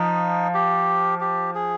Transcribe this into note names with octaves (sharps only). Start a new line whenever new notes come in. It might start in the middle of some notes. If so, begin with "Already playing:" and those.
Already playing: F3 D#4
G4
G4
G#4